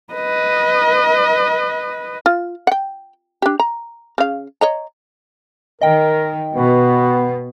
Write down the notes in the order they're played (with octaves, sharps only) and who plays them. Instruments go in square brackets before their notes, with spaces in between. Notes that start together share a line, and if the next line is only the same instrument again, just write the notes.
[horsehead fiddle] B4 D#5
[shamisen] F4
F#5 G5
D4 G4
A#5
C#3 F5
C#5 D#5 A#5
[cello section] D#3 [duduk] A#4 [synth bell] D#5 G5
[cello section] B2 [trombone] B3 [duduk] F#4